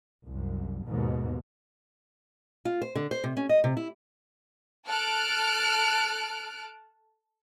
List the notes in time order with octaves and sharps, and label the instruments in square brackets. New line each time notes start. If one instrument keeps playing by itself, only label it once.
[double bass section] C2 F#2
D#2 G#2 B2
[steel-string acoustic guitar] F4
C5
D3
C5
C3
C#4
D#5
C3
E4
[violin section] A4 A5 F6 F#6 D7